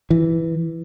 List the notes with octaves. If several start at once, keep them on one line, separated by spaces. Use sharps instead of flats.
E3